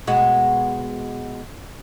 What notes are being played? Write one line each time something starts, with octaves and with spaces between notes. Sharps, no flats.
B2 G#3 F#4